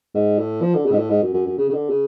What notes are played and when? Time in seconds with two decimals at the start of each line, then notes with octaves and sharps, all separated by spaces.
0.15 G#2
0.39 A2
0.62 F3
0.75 D3
0.86 C#3
0.92 G#2
0.98 A2
1.10 G#2
1.23 F#2
1.34 F#2
1.46 F#2
1.58 C#3
1.69 C#3
1.74 D3
1.90 C#3